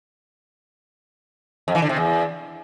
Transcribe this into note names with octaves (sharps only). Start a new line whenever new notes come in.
F2
E3
D3
C3
E2